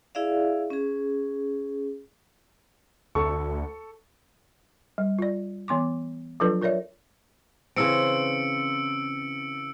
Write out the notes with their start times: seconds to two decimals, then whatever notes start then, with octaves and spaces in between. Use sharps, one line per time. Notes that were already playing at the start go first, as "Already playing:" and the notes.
0.15 E4 G#4 D5 E5 F5
0.70 C#4 G#4
3.15 D2 A4 C#6
4.98 G3
5.19 F4 D5
5.68 E3 B3 C6 D6
6.40 F3 F#3 D4 F4 A4 B4
6.62 F4 A#4 C#5 D5 E5
7.76 C#3 E3 C4 E6 C#7 D7